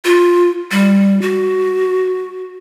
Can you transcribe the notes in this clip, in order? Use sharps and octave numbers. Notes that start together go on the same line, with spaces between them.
F4
G3
F#4